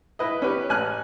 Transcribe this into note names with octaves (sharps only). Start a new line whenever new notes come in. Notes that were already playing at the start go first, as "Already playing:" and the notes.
E4 B4 D#5
C#4 G4 B4
A1 G#5 F6 F#6